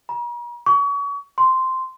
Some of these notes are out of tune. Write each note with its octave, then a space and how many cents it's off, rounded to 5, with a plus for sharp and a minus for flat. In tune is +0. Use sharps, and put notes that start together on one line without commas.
A#5 +45
C#6 +35
C6 -5